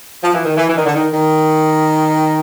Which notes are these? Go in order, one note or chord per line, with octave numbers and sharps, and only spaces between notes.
F3
E3
D#3
E3
E3
D#3
D3
D#3
D#3